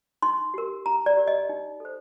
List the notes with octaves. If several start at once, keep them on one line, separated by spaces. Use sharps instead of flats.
D#4 C6
G4 A#4
D#4 A#5
D5
G4 A#4
D#5
D#4
A4 C5